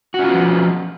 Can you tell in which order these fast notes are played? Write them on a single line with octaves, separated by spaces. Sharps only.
F#4 C#4 F4 B3 F3